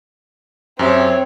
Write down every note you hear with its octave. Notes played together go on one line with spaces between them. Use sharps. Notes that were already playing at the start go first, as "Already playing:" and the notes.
F#2 C4 G4 C#5 E5